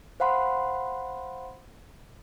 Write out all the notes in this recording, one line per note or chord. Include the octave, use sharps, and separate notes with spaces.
C5 F5 F#5 B5 C6